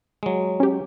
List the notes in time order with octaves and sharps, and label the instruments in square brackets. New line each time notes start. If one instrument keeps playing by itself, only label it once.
[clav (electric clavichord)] F#3 G#3
[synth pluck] C#4 G4